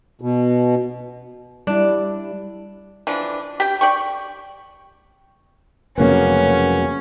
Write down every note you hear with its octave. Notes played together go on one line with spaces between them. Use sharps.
B2
G3 D4 E4
E3 F3 D4
G4 G5
D5 G5 C#6
F1 C#3 F#3 A#3 B3 C#4